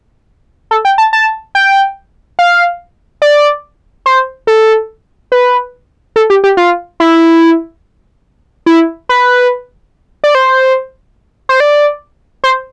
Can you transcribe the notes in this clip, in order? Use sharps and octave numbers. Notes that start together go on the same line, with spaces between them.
A4
G5
A5
A5
G5
F5
D5
C5
A4
B4
A4
G4
G4
F4
E4
E4
B4
D5
C5
C5
D5
C5